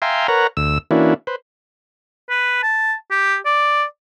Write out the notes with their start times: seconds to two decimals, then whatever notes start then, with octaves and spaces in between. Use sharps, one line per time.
0.02 E5 F5 G5 G#5 A#5 C6
0.28 A#4 B4 C#5 F#5 A#5
0.57 D2 E6
0.91 E3 A#3 C#4 D4 E4 F#4
1.27 B4 C5
2.30 B4
2.63 A5
3.11 G4
3.46 D5